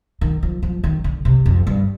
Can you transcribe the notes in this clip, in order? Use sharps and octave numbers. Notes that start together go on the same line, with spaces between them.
D#3
F3
F3
D#3
D3
C3
F2
G2